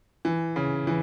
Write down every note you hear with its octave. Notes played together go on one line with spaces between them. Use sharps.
E3
C#3
E3